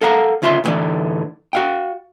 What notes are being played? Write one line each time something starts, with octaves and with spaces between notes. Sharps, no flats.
A4 A#4 F5 F#5 A#5
D2 C#3 F4 E5 B5 C6
C2 A2 D3 E3 D5
F#4 F5 G5